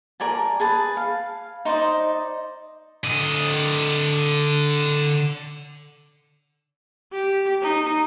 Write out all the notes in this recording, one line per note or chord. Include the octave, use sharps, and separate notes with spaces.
A#4 D5 G#5 A5
G#4 B4 A5
F5
D#4 C5 D5 D#5
D3 D#5
G4
D#4